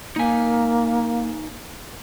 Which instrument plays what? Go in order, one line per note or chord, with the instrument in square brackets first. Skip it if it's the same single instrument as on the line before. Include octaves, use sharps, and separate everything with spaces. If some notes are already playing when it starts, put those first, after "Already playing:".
[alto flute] A#3 [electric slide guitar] D#4 G#5